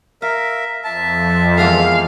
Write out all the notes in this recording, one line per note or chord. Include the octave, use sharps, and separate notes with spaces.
A#4 E5 F5
F2 E5 A5
E2 G#3 A#4 F5